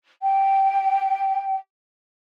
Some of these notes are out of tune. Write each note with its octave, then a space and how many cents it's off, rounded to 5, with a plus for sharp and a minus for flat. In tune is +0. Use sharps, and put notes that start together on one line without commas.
G5 -10